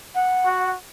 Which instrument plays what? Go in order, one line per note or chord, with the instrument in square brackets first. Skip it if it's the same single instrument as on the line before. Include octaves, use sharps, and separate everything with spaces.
[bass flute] F#5
[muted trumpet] F#4